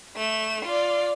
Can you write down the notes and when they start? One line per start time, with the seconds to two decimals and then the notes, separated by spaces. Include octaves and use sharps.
0.16 A3 E7
0.65 F4 D5